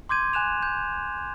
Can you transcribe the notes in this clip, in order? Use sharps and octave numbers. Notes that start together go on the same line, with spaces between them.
C6 D6 G6 G#6 D#7
G#5 F#6 E7 F7
G6